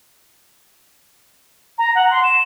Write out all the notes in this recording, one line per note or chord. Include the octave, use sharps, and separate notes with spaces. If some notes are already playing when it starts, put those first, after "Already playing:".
A#5
F#5
C6
E7